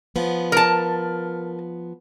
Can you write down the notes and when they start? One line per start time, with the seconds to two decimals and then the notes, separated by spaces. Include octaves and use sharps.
0.16 F3 B3
0.52 A#4 A5